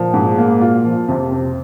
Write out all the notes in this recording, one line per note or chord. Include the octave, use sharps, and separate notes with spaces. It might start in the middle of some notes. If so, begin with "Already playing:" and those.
Already playing: A#2 F3
G#2
A#3
F4
F3
F2 C3
C4